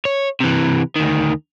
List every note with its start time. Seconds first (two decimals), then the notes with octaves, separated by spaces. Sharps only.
0.05 C#5
0.40 C3 E3
0.96 D2 D#3